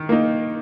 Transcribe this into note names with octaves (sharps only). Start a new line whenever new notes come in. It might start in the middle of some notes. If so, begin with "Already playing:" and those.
Already playing: D#3
A#3 D#4